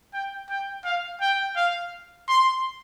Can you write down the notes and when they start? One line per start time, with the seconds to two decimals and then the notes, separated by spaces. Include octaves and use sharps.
0.14 G5
0.50 G5
0.85 F5
1.21 G5
1.56 F5
2.28 C6